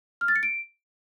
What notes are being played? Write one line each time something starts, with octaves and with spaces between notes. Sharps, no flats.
F6
A6
C#7
D7